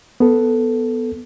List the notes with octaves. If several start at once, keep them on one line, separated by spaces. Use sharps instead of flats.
B3 A4